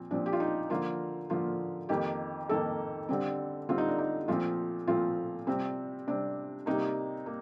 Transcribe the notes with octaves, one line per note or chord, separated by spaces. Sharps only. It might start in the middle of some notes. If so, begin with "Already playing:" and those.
Already playing: A#2 F3 C4
A#2 F3 C4 D4
G4
F4
D#4
D3 F3 A#3 F4
D3 F3 A#3 F4
F2 D#3 A#3 G4
F2 D#3 A#3 A4
D3 G3 C4
D3 G3 C4 F4
D#4
D4
D#4
A#2 F3 A3 C4 F4
A#2 F3 A3 C4 F4
C3 G3 C4
C3 G3 C4 D4
C3 G3 A#3 D#4
A#3